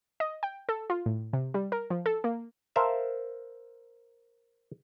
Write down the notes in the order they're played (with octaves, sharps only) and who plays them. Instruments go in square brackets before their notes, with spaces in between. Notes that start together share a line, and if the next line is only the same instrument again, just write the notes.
[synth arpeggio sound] D#5
G5
A4
F4
A2
C3
G3
A#4
F3
A4
A#3
[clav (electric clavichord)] A#4 C5 E5 F5 A5